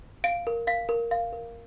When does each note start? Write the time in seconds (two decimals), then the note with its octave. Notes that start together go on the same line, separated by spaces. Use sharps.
0.24 F5 D7
0.47 A#4
0.67 F5 B6
0.89 A#4
1.11 F5
1.33 A#4